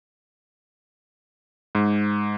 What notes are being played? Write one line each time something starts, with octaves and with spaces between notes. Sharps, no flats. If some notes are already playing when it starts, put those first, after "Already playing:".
G#2